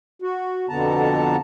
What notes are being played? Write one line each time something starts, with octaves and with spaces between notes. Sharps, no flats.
F#4
F2 B2 D3 B3 A5 A#5